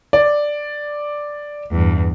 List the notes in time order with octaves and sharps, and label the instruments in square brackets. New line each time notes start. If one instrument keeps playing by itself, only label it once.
[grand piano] D5
[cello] E2 G2